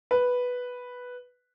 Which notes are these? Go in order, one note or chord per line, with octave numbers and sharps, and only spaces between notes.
B4